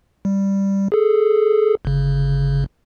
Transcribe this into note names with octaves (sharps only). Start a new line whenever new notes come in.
G3
G#4 A4
G1 C#3